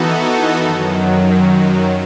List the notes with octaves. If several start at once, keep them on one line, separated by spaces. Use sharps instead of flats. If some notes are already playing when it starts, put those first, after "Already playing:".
Already playing: E3 B3 D#4 F#4 A4
F#2 D#3 F#3